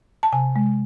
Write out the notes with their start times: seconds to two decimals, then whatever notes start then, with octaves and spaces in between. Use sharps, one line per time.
0.23 A5
0.33 C3 G#5
0.56 G#3